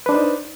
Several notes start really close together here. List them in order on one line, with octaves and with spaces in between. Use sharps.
B4 D4 C5 D#4